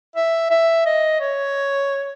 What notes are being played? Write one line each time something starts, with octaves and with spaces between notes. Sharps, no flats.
E5
E5
D#5
C#5